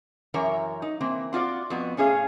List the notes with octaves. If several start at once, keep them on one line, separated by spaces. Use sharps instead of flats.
F#2 E3 A#4 C#5 A#5
D#4
E3 A#3 C4
C4 F4 F#4 D5
F2 B3 F#4
A2 C#4 G#4 C#5 F5